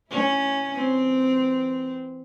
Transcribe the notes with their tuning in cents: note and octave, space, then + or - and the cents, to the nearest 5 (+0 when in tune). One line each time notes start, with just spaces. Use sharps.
C#4 +0 E4 +0
E3 +0 C4 -10